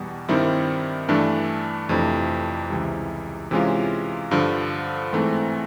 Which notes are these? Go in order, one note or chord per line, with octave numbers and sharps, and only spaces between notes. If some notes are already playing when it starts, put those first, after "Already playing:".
Already playing: E2 B2 G3 B3
G2 D#3 G3 C4 E4
G2 E3 A3 D4
F2 C3 E3 A3 D4
C#2 C3 E3 G3
C3 E3 G#3 C#4 F4
G2 D3 F3
G#2 E3 A3 C4